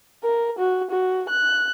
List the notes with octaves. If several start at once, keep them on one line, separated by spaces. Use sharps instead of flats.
A#4
F#4
F#4
F#6